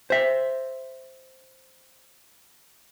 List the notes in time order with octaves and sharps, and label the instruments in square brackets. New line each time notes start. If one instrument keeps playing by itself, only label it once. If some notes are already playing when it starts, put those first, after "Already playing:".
[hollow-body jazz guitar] C5 E5